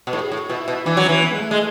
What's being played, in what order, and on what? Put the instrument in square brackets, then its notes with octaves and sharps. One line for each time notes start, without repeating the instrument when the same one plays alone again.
[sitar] B2
[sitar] A2 [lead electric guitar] F#4
[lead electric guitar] G#4
[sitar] A2 [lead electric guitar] F#4
[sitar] B2 [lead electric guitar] E4
[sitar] B2
[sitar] E3 [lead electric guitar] D4
[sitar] F#3
[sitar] E3 [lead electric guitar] C#4
[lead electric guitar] B3
G#3
A3
[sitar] G#3